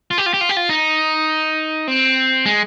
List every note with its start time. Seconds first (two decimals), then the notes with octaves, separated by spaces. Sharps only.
0.11 F4
0.18 G4
0.26 F4
0.34 G4
0.41 F4
0.49 G4
0.57 F4
0.69 D#4
1.88 C4
2.46 G#3